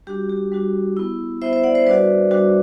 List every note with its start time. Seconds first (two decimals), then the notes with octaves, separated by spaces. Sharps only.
0.07 G3 D4 F#4 G4
0.29 G4
0.52 G3 D4 F#4
0.97 B3 E4
1.42 B3 E4 C5 E5
1.53 C5 E5
1.64 D5 F#5
1.75 C5 E5
1.86 G3 D4 F#4 B4 D5
2.31 G3 D4 F#4